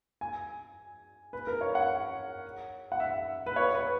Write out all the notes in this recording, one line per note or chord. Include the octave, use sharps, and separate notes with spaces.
G#5
B4
A#4
C#5
F#5
F#5
E5
B4
C#5
B4